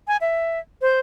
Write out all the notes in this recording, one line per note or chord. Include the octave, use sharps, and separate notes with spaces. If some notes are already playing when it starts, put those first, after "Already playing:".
G#5
E5
C5